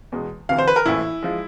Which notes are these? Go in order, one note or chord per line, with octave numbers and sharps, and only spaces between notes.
E2 B2 G#3
D2 C3 E3 F5
C5
B4
A#4
A#1 A2 E3 E4
F3 G#3